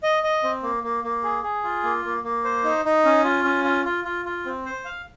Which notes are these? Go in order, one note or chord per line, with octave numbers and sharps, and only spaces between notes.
D#5
D#5
C4
A#3
A#3
A#3
G#4
G#4
F4
A#3
A#3
A#3
C5
D#4
D#4
C#4
F4
C#4
F4
F4
F4
F4
C4
C5
F5